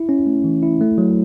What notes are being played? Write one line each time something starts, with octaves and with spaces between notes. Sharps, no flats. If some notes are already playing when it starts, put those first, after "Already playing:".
Already playing: E4
C#4
A3
E3
E4
A3
F#3